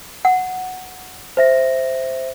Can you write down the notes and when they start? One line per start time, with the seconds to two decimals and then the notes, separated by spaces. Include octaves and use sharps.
0.25 F#5
1.37 C5 E5 A#6